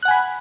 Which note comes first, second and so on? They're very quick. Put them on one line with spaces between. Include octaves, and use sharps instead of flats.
F#6 F#5 G#5 B5